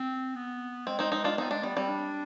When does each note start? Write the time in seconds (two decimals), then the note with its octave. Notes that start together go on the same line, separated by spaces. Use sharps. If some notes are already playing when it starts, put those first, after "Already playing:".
Already playing: C4
0.35 B3
0.87 G#3 C4
0.99 C4 D#4
1.12 C4 D#4
1.24 D4 F4
1.38 B3 C4 D#4
1.50 G#3 D4
1.63 G3 B3
1.76 G3 C4
1.88 D4